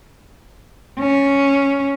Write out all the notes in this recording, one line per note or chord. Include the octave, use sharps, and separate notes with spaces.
C#4